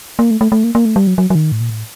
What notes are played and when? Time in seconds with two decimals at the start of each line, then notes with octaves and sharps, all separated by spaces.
0.19 A#3
0.31 A3
0.41 A3
0.52 A3
0.64 A#3
0.75 A#3
0.85 A3
0.96 G3
1.07 F#3
1.18 F#3
1.30 F#3
1.35 D#3
1.52 A2
1.61 A#2
1.70 A2